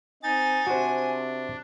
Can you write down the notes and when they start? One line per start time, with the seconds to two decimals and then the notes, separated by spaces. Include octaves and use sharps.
0.23 C4 D#4 G#5 A6
0.67 C3 D4 F#4 C5